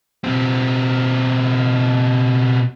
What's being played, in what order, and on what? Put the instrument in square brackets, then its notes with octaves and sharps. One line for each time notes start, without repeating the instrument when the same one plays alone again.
[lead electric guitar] B2 C4